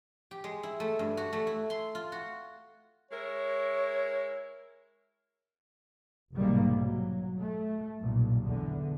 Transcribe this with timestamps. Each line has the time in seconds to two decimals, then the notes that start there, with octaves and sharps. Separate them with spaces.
0.31 G4
0.44 G#3
0.63 E4
0.80 A3
0.99 G2
1.17 F#4
1.33 A3
1.47 E4
1.70 C6
1.95 F4
2.12 F#4
3.11 G#3 E4 A#4 C#5
6.35 F1 B1 G#2 D#3 G3 A#3
6.76 F#3
7.41 A3
7.99 B1 G2 A#2
8.44 E2 D3